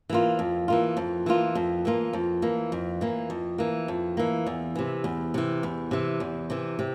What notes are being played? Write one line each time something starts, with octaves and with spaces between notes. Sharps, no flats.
E3 A#3 F4
F2
E3 A#3 F4
F2
E3 A#3 F4
F2
E3 A#3 F4
F2
E3 A#3
F2
E3 A#3
F2
E3 A#3
F2
E3 A#3
E2
C3 E3
E2
C3 E3
E2
C3 E3
E2
C3 E3
C3